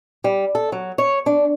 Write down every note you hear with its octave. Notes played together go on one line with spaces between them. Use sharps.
G3
A4
F#3
C#5
D4